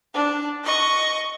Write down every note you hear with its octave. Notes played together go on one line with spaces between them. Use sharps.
D4
D#5 C#6